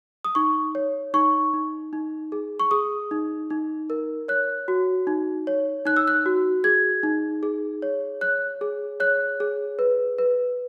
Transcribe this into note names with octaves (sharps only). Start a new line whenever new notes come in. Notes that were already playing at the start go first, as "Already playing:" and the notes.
D#6
D#4 C#6
C#5
D#4 C#6
D#4
D#4
G#4
C#6
G#4 D#6
D#4
D#4
A#4
C#5 F#6
F#4
D#4
C#5
D#4 F#6
E6
F#6
F#4
G#4 G#6
D#4
G#4
C#5
C#5 F#6
G#4
C#5 F#6
G#4
B4
B4